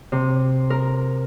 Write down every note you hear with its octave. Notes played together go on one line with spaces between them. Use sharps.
C3
A#4